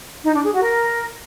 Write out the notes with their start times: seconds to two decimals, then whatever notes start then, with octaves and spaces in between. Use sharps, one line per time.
0.24 D#4
0.33 D4
0.43 G#4
0.52 F#4
0.62 A#4